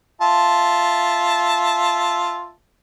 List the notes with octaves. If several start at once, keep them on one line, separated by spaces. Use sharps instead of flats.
F4 E5 A5